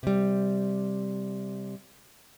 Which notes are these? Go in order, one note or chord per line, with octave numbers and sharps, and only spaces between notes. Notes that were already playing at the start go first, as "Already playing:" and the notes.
C3 G3